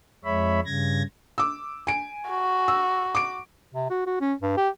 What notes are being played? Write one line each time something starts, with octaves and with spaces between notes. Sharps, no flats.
F2 G#3 C#5 E5 B5
G2 C#3 G#6 A#6
D6 E6
G#5 D7
F#4
E6
D6 D7
C3
F#4
F#4
C#4
G2
G4